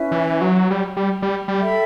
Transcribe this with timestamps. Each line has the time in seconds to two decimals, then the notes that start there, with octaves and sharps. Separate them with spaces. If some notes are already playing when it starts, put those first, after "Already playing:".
Already playing: C#4 E4 B4 E5
0.12 E3
0.41 F#3
0.71 G3
0.97 G3
1.22 G3
1.48 G3
1.60 A4 E5 G5 B5